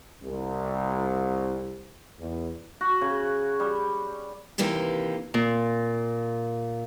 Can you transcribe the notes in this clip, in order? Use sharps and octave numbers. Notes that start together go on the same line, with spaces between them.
C2
E2
F#4
C#3
G3
D#2 C3 E3 A#3 G4
A#2